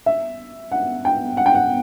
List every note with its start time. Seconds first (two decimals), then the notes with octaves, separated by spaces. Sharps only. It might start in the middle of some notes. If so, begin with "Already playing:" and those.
0.06 E5
0.72 F#5
1.05 G5
1.37 F#5
1.46 G5
1.55 F#5